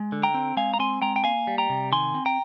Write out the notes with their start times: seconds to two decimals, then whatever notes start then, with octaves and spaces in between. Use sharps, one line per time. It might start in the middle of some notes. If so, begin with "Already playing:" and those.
Already playing: G#3
0.12 D3
0.23 G5 A#5
0.34 C4
0.57 G#3 F5 G#5
0.74 A#5
0.79 C4 G#5 C6
1.02 G#3 G5 A#5
1.16 G5
1.24 A#3 F5 G#5
1.47 G3
1.58 G5 A#5
1.70 C3
1.92 D#3 G#5 C6
2.15 C4
2.26 G5 A#5